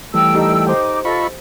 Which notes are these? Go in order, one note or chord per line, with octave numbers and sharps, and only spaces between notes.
E3 G3 A3 G5 E6
D#4 G4 A4
D#4 C5 G5 D6
F4 A4 D#5 B5 C#6